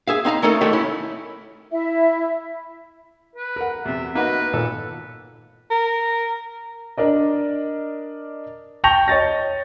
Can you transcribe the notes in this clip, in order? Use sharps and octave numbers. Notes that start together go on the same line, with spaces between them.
G#4 E5 F5
C4 D#4 F5 A#5
A3 C#4 D#4 A4 A#4
F2 D#3 G#3 A3
C#4 E4
E4 E5
B4
A#4 F#5
E2 C3 E5
A#3 B3 D#4 F#4 B4
A#2 A4
A#4
D4 A#4 D5 D#5
G5 A5 C#6 G6 A#6 F7
C#5 D#5 A6 A#6